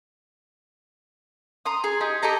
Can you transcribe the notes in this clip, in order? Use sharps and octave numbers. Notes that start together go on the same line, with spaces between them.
A#5 C6 D#6
G#4
D#4 G4 G#4
G4 A4 D#5 A#5